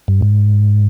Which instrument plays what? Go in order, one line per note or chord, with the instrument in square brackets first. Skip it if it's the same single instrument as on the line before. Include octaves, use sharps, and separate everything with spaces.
[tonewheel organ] G2
G#2